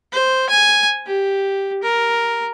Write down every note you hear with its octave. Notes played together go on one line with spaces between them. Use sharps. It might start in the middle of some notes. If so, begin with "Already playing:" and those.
C5
G#5
G4
A#4